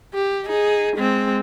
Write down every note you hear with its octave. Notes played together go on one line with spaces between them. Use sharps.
G4
D#4 G#4
G#3 C4